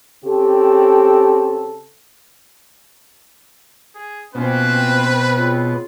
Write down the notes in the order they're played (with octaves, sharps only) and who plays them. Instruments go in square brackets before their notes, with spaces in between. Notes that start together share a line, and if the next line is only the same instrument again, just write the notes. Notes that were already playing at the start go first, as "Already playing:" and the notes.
[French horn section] C#3 C4 G4 A4
[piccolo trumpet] G#4
[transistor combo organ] B2 [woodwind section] F3 A#3 C#4 [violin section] C4 C5 [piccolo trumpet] B4
[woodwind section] C#3 C4 F4